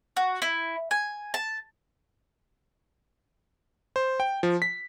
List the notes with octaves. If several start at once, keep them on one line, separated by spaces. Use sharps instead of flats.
F#4
E4
G#5
A5
C5
G5
F3
B6